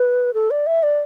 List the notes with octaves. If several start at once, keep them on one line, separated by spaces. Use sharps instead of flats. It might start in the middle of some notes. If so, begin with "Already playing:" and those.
Already playing: B4
A4
D5
E5
D5